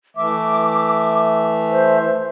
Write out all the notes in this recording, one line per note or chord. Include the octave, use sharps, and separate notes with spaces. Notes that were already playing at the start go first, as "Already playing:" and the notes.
E3 A3 E5 D6
C5